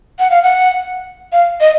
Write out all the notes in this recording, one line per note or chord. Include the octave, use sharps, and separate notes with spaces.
F#5
F5
F#5
F5
D#5